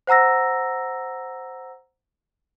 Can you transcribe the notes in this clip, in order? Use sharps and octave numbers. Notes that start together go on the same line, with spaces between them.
C5 F#5 A#5 E6 A#6